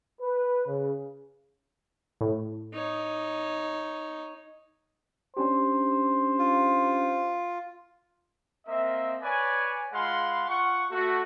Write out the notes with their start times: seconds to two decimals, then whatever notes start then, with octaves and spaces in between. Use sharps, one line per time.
0.20 B4
0.67 C#3
2.21 A2
2.73 D#4 C#5
5.37 C#4 D4 G4 C5
6.39 F4
8.66 A#3 C4 D#5 E5
9.22 B4 C#5 D5 G#5
9.93 G#3 F4 F5 F#5 B5 C6
10.49 F4 F#5 C#6
10.91 A3 F#4